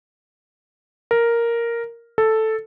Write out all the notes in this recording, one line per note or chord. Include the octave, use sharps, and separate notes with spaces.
A#4
A4